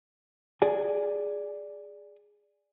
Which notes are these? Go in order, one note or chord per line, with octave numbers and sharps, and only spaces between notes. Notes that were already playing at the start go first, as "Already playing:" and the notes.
G#4 D5 G#5